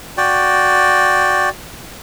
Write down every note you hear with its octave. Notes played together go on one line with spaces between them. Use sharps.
F#4 D5 G5